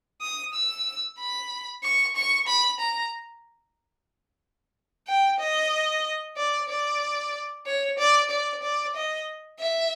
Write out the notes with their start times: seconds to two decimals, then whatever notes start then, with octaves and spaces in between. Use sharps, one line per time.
0.22 D#6
0.54 E6
1.19 B5
1.83 C#6
2.16 C#6
2.48 B5
2.80 A#5
5.07 G5
5.40 D#5
6.37 D5
6.69 D5
7.66 C#5
7.99 D5
8.31 D5
8.63 D5
8.96 D#5
9.60 E5